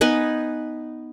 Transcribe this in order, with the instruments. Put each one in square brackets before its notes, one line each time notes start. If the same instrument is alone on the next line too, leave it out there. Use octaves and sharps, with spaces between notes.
[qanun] B3 D#4 B4 G#5